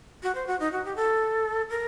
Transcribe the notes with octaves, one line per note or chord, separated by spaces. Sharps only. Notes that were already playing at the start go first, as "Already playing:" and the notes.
F#4
C5
F#4
D#4
F#4
G4
A4
A#4